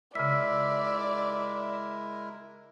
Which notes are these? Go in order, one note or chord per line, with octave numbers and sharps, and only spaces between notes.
C#3 G#3 E4 A#4 D5 E5 E6